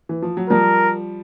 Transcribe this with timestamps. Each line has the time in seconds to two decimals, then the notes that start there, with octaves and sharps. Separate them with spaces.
0.09 E3
0.22 F3
0.37 F#3
0.50 F3 G3 A#4